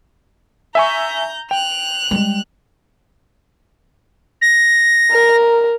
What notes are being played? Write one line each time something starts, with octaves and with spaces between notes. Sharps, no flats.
E5 G#5 A#5 C#6 G6
G5 F#6 F7
G3 G#3
A#6
A#4